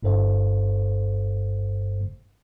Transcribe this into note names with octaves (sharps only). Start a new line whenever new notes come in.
G1 G2 A4 C5 F5